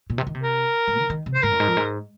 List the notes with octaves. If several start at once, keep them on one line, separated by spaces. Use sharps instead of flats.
A#2
C3
D#3
C3
A#4
G#2
D#3
D#3
C3
C5
G#2 A#4
F2
G#2
F2
G#2